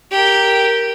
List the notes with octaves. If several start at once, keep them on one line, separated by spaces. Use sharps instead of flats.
G4 A#4